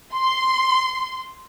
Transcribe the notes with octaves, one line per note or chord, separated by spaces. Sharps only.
C6